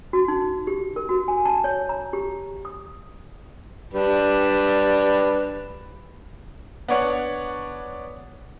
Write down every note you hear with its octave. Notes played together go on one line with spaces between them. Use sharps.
F#4
D#4
G4
A#4
F#4
G#5
A5
C#5
A#5
G4
D#6
G3 D4 B4
B3 D4 C#5 F#5